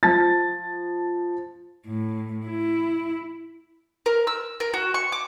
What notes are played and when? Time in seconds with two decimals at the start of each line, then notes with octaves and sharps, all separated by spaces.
0.03 F3 A5 A6
1.87 A2
2.45 E4
4.06 A#4
4.27 E6
4.60 A#4
4.74 F#4
4.94 C#6
5.12 D6